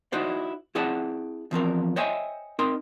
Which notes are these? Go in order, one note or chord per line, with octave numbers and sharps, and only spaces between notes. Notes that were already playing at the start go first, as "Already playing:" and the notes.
D#4 E4 F#4 C5 D5
C4 E4 G#4 D5 F#5 A5
E2 F3 C4 A#4
C5 C#5 D#5 E5 G5 G#5
C4 D#4 A#4 C6